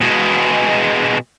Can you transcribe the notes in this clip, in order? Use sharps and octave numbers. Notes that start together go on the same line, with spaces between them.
B2 G#3